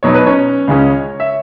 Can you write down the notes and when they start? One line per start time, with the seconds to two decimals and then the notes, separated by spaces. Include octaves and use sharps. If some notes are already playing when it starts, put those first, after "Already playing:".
0.03 B2 F#3 B3 D#4 C#5
0.14 B4
0.26 C#4 C#5
0.68 C#2 C#3 G#3 C#4
1.20 E5